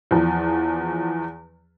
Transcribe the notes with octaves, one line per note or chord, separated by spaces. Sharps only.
E2 F3